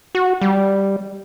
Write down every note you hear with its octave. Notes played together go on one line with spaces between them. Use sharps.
F#4
G3